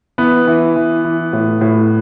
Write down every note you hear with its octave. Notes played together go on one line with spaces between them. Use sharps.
E3 B3
E3
E3
E3
A2
A2